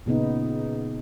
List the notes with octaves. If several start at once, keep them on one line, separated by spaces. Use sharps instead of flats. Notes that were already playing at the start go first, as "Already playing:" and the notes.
A#2 C#3 B3 D#4